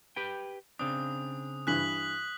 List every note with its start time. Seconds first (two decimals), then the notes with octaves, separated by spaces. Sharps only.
0.16 G4 B4 G5
0.79 C#3 C4 D4 D#6
1.67 G2 E3 F#6 B6 F#7